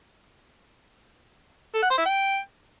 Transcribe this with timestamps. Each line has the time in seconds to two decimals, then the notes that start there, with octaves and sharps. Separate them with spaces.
1.75 A4
1.82 F#5
1.90 C5
1.98 E4
2.06 G5